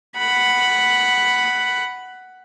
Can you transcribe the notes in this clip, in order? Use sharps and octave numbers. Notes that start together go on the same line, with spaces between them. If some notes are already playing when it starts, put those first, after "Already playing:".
F#5 B5